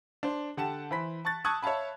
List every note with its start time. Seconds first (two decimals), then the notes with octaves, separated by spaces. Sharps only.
0.23 D4 C5
0.57 D3 G4 F#5 A5 E7
0.91 E3 C5 B5 B6
1.25 A5 C#6 F#6 A6
1.45 A5 C#6 D#6 E6 F#6 G#6
1.63 C#5 E5 F5 A5 B5